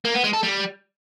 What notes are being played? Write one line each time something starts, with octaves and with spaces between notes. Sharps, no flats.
A#3
B3
G#3
A4
G3